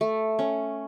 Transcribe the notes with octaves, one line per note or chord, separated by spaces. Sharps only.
A3
C#4